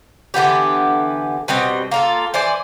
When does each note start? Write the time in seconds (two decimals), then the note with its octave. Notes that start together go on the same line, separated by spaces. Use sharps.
0.34 D3 E3 B3 G4
1.48 B2 G3 C4 D#5
1.91 A#3 F4 A4
2.34 E3 C5 D5 G#5